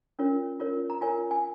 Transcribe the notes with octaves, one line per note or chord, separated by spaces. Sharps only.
C#4 F4 A#4 C#5
F4 A#4 C#5
A#5
F4 A#4 C#5 G#5
G#5